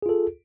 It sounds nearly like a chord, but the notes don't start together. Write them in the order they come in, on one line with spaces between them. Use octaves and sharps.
G#4 F4 A4